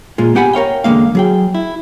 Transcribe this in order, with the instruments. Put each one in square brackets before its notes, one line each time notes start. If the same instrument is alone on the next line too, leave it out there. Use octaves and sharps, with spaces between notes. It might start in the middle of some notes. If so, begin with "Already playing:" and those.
[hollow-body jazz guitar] A#2 G#3 F4
B3 G4 F#5 G#5 B5
A#4 C#5 F5 G5
E2 D3 F#3 G#3 A#3 F5
F#3 G#4 G5
E4